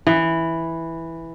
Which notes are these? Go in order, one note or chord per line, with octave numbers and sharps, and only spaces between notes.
E3